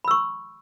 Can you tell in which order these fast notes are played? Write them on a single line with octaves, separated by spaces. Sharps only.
B5 E6 C#6